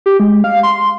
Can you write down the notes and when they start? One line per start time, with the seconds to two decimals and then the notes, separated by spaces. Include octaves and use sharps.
0.06 G4
0.20 G#3
0.44 F5
0.63 C6